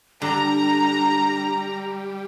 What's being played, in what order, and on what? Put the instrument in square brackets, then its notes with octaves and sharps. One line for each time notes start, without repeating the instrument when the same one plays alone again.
[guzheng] D3 [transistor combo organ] G3 [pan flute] D4 [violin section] A#5